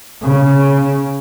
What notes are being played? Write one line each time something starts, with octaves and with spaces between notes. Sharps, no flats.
C#3